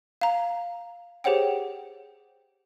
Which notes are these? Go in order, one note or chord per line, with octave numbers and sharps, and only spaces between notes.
F5 A#5
G4 G#4 C5 C#5 F#5 G5